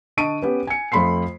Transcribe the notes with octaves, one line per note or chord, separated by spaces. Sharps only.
D3 D#5 A5 C#6 D7 D#7
B3 C#4 G4 B4
G#5 C#7
F2 F3 A3 B5 C6 C7